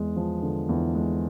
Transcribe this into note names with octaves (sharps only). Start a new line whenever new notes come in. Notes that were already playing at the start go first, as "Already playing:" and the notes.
Already playing: E2 G#3
F3
D3
E2
G#3